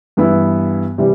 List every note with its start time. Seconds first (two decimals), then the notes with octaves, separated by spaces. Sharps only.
0.17 G2 E3 B3 E4
0.98 C3 E3 G3